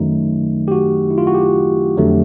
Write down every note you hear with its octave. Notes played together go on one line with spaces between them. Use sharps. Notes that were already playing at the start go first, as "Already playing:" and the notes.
Already playing: F#2 D#3 F#3 A3 D#4
G4
F#4
E4
F4
F#4
G4
F2 D3 F#3 A3